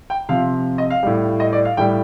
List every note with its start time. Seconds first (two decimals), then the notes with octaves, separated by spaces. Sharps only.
0.10 G5
0.29 C3 F3 F5
0.78 D#5
0.90 F5
1.03 A2 G3
1.40 D#5
1.53 D5
1.65 F5
1.77 A2 G3 G5